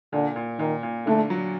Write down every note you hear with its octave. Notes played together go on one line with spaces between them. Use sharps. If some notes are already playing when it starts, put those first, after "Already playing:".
A#2 D3
A#2
A#2 D#3
A#2
D3 A3
F#3